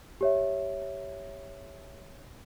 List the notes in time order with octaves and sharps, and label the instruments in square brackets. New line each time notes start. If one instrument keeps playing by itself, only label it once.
[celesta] G4 C#5 E5